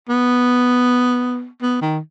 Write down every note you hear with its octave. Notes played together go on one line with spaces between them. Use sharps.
B3
B3
D#3